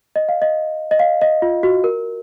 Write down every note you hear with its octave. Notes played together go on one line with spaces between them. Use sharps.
D#5
F5
D#5
D#5
F5
D#5
F4
F#4
A#4